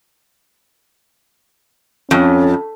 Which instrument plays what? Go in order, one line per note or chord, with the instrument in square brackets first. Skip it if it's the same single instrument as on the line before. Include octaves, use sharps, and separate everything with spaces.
[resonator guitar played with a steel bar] F2 [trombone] C#4